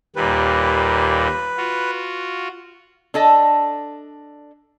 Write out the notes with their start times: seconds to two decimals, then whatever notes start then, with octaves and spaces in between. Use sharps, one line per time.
0.16 D#2 A#2 G3 B4
1.57 F4 F#4
3.14 D4 A4 D#5